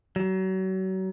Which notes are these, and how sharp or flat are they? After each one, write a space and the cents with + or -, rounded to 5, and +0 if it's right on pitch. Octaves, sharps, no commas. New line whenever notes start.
F#3 +35